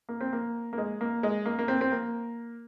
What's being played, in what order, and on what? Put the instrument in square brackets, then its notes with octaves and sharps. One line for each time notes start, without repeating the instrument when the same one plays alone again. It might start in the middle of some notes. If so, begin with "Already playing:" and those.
[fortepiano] A#3
C4
A#3
A#3
G#3
A#3
G#3
A#3
A#3
C4
C4
A#3